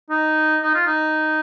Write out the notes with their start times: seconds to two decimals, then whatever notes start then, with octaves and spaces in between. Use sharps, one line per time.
0.10 D#4
0.62 D#4
0.74 F4
0.87 D#4